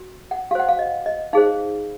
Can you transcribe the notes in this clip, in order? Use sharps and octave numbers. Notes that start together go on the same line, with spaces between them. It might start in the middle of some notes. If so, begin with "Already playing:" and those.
Already playing: F#4
F#5
F#4 C5 F5 F#5
F5
D#5
D#5
D#4 G#4 C5 F5